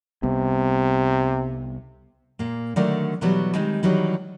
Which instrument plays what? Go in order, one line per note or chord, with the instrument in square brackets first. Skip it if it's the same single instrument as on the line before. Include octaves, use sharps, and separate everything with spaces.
[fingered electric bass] C2 G3 B3 [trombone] C3
[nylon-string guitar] A#2 A#3
D3 D#3 F#3 A3 A#4 D5
B2 E3 F#3 G3 B3
D#3 G3 G#3 C4 D#4
D#3 E3 F#3 G3 D#4